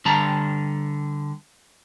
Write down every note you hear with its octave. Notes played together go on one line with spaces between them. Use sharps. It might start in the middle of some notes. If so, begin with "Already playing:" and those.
D3 G3 A5 A#5